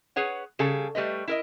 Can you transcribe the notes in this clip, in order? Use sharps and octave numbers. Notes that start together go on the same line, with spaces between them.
G#4 B4 C#5 F#5
C#3 G3 G#4 A4
G3 A3 B4 D#5
E4 A#4 D#5